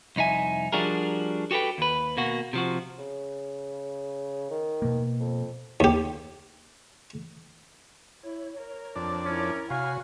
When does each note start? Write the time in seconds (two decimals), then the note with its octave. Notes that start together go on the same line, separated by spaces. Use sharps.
0.16 C2 F2 D#4 E5 G#5
0.72 F3 G3 D4 F#4 G#4 A#4
1.51 F#4 G4 A4 B4 G5
1.78 D#2 B4
2.17 B2 A#3 F#4
2.53 C3 F3 F#4
2.98 C#3
4.50 D#3
4.82 B2 A#3
5.20 F2
5.80 D#2 G4
8.23 E4 C#5
8.57 A#4
8.96 F2 D4 D5
9.25 C#4 E4 A#4
9.70 C3 F#4 C#5 F5 G#5 B5